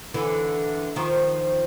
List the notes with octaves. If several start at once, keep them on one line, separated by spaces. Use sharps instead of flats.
D3 E3
D#3 F3